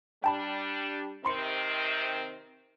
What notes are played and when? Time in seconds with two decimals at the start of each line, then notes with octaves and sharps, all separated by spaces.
0.24 G3 D4 G5 A5 B5
1.25 C3 D#3 C4 B5 C6 C#7